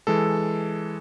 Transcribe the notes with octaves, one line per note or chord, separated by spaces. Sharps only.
E3 G#3 A4